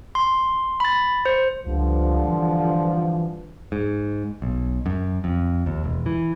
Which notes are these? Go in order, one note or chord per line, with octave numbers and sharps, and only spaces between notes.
C6
B5 A6
C5
C#2 G2 D3 F3
E3
G#2
B1
F#2
F2
D#2
E1
E3